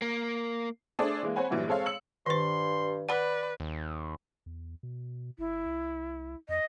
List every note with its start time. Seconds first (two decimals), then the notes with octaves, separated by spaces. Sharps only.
0.02 A#3
0.99 A3 D4 G#4 A4 C5 D5
1.23 E3 G#3 A#3
1.36 C4 C5 C#5 F#5 G#5 B5
1.51 G2 A#2 E3 F#3 G3
1.68 G#3 C4 A4 C#5 F5
1.86 E6 C#7 F#7
2.26 G2 D#3 C5 C6
3.09 B4 D5 F#5 B5
3.60 D#2
4.46 E2
4.83 B2
5.38 G1 E4
5.66 C2
6.49 F2 D#5